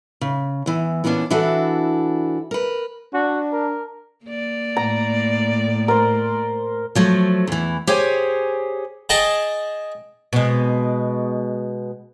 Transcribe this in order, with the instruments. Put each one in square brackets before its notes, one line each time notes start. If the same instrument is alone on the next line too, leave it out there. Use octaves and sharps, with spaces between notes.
[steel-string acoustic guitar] C#3
E2 E3
A#2 E3 B3 C#4 D4
E3 D4 E4 F#4 A4
A#4 B4
[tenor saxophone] D4 [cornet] F#4
[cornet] A#4
[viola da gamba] A#3 D5
[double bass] A2 [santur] A#5
[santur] A#4 C5
[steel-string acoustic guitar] F3 F#3 A3
E2 E3
G4 G#4 C5 C#5 G#5
[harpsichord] G#4 D#5 G5 A5
[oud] B2 G#3